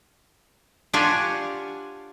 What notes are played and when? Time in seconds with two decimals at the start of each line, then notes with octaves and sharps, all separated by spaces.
0.93 D4 F4 G4 C#5 F#5 G#5